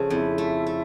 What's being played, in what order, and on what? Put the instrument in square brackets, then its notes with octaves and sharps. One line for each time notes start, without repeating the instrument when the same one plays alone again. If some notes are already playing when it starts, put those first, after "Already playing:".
Already playing: [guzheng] C#3 F3 A3
[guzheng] F2 [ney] E4
[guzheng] A3
A3